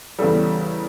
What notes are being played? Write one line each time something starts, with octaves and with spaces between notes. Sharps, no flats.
E2 C#3 G3 A4